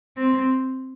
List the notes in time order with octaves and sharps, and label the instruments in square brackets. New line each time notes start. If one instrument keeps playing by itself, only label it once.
[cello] C4